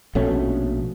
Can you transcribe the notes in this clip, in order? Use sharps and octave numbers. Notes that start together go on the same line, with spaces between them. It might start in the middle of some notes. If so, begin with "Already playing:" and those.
A#1 B2 A3 C#4